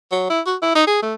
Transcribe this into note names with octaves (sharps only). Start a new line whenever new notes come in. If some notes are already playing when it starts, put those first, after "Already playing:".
F#3
E4
F#4
E4
D#4
G#4
A3